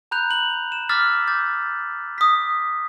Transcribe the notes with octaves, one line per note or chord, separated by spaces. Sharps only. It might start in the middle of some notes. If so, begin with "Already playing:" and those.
A#5 B5 F#6 G6 F7
F#7
E7
D6 E6 F6 A6 B6
D6 G6 A6
D#6 B6